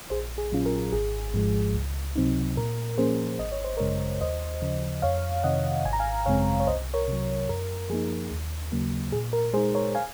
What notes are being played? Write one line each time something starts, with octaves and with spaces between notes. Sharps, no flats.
A#1 G#4 C5
G#4
A#2 F#3 C#4 F4
A#4
G#1 G#4
G#2 F3 G#3
C#2
C3 F#3 C4 D#4
A#2 A#4
F3 A#3 C#4 G#4 C5
G#1 D#5
C#5
C5
F#2 C#3 G#3 A#4 C#5
D#2 C5 D#5
C#3 F3
F2 C#5 F5
C3 D#3 D#5 F#5
G#1 G#5
A#5
F5 G#5
F#2 C#3 G#3 C4 C#5 F5
C#5
C2 C5 D#5
A#4 C#5
C3 F#3
F#2 A#4
F3 A#3 D#4 G#4
D#2
C#3 F#3 A#3
A#2 G#4
A#4
G#3 D#4 G#4 C5
A#4 C#5
F5 G#5